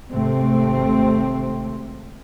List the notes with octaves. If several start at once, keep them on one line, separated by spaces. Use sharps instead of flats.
G#1 C3 A3 C4